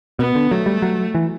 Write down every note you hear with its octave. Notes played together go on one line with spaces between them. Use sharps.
B2 B3
D3
F#3 A3
G3
F#3
E3